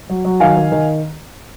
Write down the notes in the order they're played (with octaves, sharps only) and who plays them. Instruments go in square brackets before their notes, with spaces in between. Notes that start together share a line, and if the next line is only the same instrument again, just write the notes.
[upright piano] F#3
F#3
D#3 F5 G#5
D#3
D#3